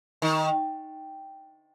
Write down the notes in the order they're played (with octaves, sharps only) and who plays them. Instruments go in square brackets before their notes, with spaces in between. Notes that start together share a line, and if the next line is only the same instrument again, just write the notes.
[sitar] D#3